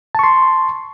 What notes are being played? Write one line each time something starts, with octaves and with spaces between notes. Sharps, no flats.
A5 C6 C#6